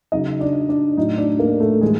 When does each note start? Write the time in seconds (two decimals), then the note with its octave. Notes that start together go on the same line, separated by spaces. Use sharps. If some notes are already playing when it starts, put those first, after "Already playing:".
0.12 C#3 F#3 D#4 D#5
0.40 D4 D5
0.69 D4 D5
0.97 A2 F#3 D#4 D#5
1.18 D4 D5
1.39 A#3 A#4
1.60 A3 A4
1.81 A2 E3 G3 G#3 G#4